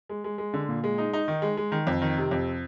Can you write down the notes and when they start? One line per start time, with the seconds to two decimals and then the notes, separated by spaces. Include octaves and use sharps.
0.09 G#3
0.24 G#3
0.38 G#3
0.54 D3
0.69 A#2
0.84 G#3
0.98 D#4
1.13 D#4
1.28 D#3
1.42 G#3
1.57 G#3
1.72 D#3
1.87 F2
2.02 D#3
2.17 C3
2.31 F2